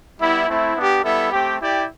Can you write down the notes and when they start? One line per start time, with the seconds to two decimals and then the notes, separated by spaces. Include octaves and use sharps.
0.19 G3 B3 E4
0.46 A3 C4 E4
0.76 B3 D4 G4
1.03 G3 B3 E4 A4 E5
1.31 A3 C4 G4
1.60 E4 G4 D5 G5